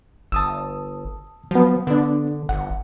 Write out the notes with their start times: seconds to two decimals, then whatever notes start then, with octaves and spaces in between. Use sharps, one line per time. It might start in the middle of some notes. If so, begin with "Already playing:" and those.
0.32 G1 A5 D#6 E6
1.51 F3 F#3 B3
1.87 D3 B3 D4
2.49 G1 F#5